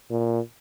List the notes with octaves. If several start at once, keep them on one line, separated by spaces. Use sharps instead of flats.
A#2